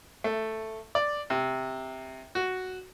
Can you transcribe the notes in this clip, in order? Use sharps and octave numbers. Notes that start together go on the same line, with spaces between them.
A3
D5
C3
F#4